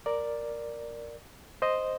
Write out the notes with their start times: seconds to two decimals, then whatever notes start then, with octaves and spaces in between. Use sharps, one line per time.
0.06 A#4 D5
1.62 C5 D#5